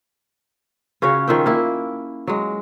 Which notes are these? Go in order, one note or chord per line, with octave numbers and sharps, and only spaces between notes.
C#3 C#4 F#4 C#5
D#3 F3 E5 G5
A#3 E4
F#3 G#3